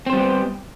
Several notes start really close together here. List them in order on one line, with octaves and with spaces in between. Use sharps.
C4 C5 G3 B3 G4